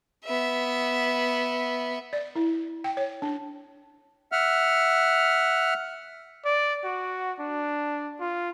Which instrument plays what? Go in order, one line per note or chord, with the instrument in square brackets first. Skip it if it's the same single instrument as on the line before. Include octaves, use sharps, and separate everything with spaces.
[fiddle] B3 E5
[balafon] D5
E4
G5
C#5
D4
[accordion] E5 F#5 F6
[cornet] D5
F#4
D4
F4